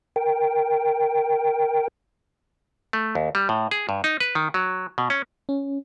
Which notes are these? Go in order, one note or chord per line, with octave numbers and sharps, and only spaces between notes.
A#4 G5
A3
D#2
G3
A2
G#4
G2
D#4
B4
D#3
F#3
B2
C#4
C#4